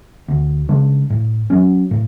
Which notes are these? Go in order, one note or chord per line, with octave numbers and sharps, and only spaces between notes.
D2
C#3 G#3 D4
A2
F#3 C#4
A2